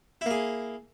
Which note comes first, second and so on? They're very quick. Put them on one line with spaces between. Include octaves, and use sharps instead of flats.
E4 A#3 G#4